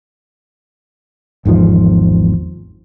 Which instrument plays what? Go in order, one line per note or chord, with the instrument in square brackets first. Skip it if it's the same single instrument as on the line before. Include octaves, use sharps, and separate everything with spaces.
[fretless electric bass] G#1 E2 G#2 F3